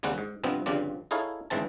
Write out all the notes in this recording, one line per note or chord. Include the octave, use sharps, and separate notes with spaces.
D#2 C#3 G3 C4 C#4 F#5
G#2
G2 C3 F3 B3 C4
G1 G2 C#3 F3 C4 D5
D#4 E4 G#4 A4 C#5 F5
G1 G#2 E3 C4 A5